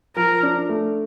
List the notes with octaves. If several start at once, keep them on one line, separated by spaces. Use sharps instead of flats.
F3 A#4
D4
A3